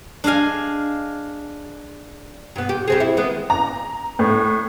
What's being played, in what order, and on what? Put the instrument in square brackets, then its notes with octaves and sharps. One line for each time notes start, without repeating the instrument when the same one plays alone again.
[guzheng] D4 G#4 D#5 F5 G#5
[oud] G2 B3
G4
G3 C4 G#4
E4
D#3 G#3 B3
[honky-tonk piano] A#5
A2